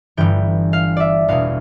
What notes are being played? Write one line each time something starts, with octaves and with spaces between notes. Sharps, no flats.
G1 G2 E3 G5
F5
D5 E5
E1 E2 B2 F5